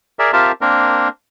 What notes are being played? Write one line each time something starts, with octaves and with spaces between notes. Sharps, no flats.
G#4 A#4 D5 E5
C4 F4 G4 A#4 E5 A5
A#3 C4 D4 A#4